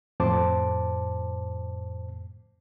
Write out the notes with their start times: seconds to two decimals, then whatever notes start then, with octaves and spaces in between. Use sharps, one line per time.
0.20 F2 A2 C5 A5 D6